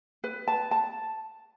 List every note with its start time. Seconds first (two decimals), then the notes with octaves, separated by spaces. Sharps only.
0.24 B4
0.48 A5
0.71 A5